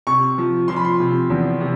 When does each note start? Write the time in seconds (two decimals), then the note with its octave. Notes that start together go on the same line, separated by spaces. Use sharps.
0.07 C3 C#6
0.38 F3
0.68 F3 C6
0.76 B5
0.85 C6
1.00 C3
1.30 E2
1.60 C3